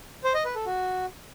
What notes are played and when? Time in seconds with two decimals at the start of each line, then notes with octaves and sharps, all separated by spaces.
0.24 C5
0.35 D#5
0.45 B4
0.55 A4
0.66 F#4